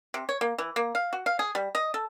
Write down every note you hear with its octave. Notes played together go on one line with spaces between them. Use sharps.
C3
C#5
A#3
E3
A#3
F5
F#4
F5
G#4
G3
D#5
A4